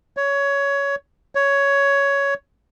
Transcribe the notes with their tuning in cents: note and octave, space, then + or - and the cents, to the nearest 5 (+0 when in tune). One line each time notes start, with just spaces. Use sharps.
C#5 +15
C#5 +10